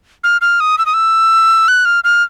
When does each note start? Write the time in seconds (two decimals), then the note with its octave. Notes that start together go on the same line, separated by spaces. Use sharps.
0.24 F6
0.41 F6
0.60 D#6
0.78 E6
0.86 D#6
0.94 E6
1.68 F#6
1.85 F6
2.04 F6